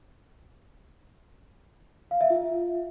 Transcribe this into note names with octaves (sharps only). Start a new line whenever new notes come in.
F5
E5
F4